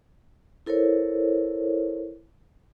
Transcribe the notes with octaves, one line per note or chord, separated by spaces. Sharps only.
E4 A4 A#4 C5 C#5